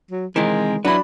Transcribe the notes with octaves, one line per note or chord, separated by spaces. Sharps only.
F#3
C3 D#3 E3 G#3 C4 A#4
F#3 D4 E4 F#4 B4 B5